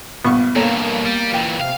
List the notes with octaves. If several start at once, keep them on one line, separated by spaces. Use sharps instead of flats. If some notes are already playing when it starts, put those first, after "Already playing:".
A#1 G2 B3 C#6
G2 B2 A#3 A4 C#5 A#5
G3
A#2 E3 G5
C3 F5